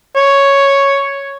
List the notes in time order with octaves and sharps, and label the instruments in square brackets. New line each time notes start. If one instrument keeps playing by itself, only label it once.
[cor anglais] C#5